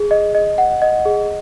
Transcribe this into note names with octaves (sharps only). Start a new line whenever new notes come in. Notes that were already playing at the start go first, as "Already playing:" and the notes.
Already playing: G#4
D#5
D#5
F#5
D#5
G#4